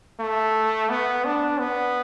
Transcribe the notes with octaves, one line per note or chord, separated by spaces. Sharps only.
A3
B3
D4
B3